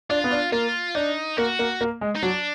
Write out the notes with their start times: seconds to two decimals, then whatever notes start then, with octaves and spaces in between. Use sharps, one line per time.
0.10 D4 F4
0.24 B3
0.31 D4
0.52 A#3 F4
0.95 D4 D#4
1.37 A#3 F#4
1.59 A#3
1.81 A#3
2.01 G#3
2.15 D#4
2.23 F#3 D4